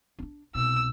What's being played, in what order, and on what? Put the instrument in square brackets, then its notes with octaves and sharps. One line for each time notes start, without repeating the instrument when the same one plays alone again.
[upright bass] C#4 D4
[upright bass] C2 B2 [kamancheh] E6